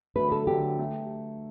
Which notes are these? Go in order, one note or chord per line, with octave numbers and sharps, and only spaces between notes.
D3 F#3 A3 B4
A4
D3 F#3 A3 G4
A3